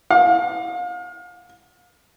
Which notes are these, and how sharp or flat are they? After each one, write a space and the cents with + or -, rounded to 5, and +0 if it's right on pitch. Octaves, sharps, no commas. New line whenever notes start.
F5 +35